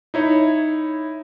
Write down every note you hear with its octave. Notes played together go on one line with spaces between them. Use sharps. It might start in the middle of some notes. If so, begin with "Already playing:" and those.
D#4 E4 C#5